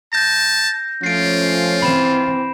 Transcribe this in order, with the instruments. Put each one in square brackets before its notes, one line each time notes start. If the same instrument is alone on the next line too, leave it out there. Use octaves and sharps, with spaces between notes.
[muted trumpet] A5 [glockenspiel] G6 A#6
[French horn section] F3 A3 C#4 [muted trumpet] F4 [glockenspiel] C7 D7
[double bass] E3 C4 [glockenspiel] B5 E7